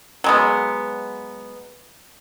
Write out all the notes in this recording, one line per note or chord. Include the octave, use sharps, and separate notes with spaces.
F#3 G#3 B3